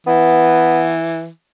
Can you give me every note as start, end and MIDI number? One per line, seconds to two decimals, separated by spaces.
0.07 1.28 52
0.07 0.97 59